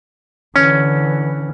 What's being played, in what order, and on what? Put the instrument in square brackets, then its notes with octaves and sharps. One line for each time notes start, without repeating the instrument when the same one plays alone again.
[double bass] D3 E3 [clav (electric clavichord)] C#4